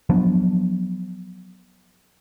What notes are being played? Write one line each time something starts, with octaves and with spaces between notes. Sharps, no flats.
F3 F#3 B3 D4